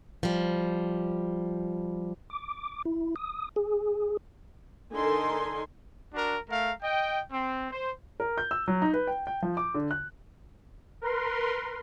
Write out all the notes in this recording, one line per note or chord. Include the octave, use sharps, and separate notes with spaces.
F3 G3
D6
E4
D#6
G#4
D3 D#4 A4 A#4 G#5 C6
D4 F#4 A#4
A3 A#4 F5
D#5 G5
C4
C5
A#4
G6
E6
F#3
D#4
B4
G5
G5
F3
D6
D3
F#6
A#4 B4 C6